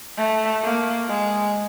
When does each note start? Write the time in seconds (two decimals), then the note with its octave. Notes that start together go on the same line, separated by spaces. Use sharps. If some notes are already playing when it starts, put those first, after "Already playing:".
0.17 A3
0.63 A#3
1.08 G#3